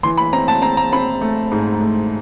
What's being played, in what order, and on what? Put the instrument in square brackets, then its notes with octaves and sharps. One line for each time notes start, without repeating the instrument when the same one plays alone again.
[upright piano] E3 C6
B5
C4 A#5
A5
C4 A#5
A#5
C4 B5
A3
G#2
A3